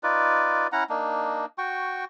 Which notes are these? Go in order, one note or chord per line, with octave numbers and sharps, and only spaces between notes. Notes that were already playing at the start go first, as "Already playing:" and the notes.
D#4 F4 B4 D5
C#4 E4 F#5 A#5
A#3 D4 D#4
F#4 G5 C#6